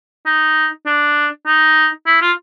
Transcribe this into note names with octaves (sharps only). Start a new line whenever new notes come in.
D#4
D4
D#4
E4
F4